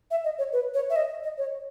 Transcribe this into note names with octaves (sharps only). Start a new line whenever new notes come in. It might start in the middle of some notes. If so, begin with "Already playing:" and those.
E5
D#5
C#5
B4
C#5
E5
D#5
D#5
C#5